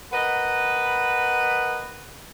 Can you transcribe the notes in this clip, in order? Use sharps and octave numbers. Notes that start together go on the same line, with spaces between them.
A#4 B4 D#5 F#5 B5